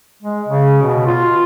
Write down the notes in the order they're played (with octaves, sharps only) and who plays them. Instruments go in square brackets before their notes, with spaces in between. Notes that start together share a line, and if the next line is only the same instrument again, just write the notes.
[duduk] G#3
C#3
B2
F4